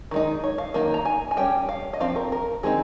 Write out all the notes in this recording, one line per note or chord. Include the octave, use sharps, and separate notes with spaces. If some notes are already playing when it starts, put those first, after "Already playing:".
D#3 G#3 D#4
C#5
F5
D#3 A#3 D#4
A#5
G#5
G#5
G3 C#4 G5
F5
D#5
F3 C4 F5
A#4
A#4
D#3 G#3 C4 D#4 G#4